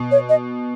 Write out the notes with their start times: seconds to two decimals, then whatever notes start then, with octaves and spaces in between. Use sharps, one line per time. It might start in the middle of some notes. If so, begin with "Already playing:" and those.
Already playing: B2
0.11 C#5
0.29 D#5